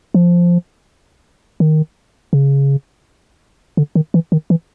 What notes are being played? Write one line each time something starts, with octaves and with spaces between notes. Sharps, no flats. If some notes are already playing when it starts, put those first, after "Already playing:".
F3
D#3
C#3
D3
D#3
E3
D#3
E3